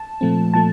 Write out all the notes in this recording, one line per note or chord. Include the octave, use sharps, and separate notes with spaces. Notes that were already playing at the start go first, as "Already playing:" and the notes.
Already playing: A5
A#2 F3 A3 C4
A#2 F3 A3 A5